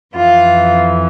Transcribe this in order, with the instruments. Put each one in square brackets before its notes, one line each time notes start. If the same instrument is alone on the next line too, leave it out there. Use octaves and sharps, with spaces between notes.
[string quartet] F2 E3 F4